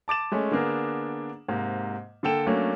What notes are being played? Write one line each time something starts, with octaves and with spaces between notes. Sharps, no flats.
A5 D6 A6 E7
G#3 A3 C#4
D3 A#3 B3 D4 G#4 A#4
G#2 C3 A#3
D3 A#3 A4 G5 E7
F#3 A3 A#3 C#4 D4